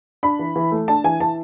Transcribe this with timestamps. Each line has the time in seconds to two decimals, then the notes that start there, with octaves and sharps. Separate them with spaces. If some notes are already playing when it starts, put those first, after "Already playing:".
0.23 D4 B5
0.39 E3
0.56 E3
0.71 A3
0.88 D4 A5
1.04 E3 G#5
1.20 E3 A5